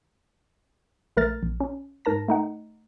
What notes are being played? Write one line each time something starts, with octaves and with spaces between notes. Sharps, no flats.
A#1 A3 A#4 F6 A6
A#1
C#4
G#2 A#4 A5 A#6
A3 D#4 F#5